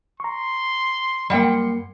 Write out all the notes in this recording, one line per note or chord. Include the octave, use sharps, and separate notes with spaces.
A#5 C6 C#6
F#2 G3 A#3 F#5 G5 C6